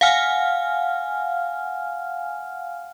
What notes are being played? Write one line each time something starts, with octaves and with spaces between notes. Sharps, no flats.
F5 F#5 G#5 F6